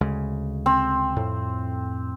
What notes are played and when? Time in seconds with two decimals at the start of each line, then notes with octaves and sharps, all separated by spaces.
0.01 D2 C#3 G#3
0.66 C4
1.17 F2 A2